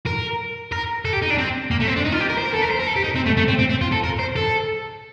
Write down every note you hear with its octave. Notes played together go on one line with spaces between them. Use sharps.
A#4
A#4
A4
G4
D#4
D4
C4
A#3
A3
C4
D4
D#4
F4
G4
A#4
C5
A#4
A4
A#4
C5
A#4
A4
G4
D#4
C4
A3
A3
C4
C4
C4
F4
A4
A#4
C5
A4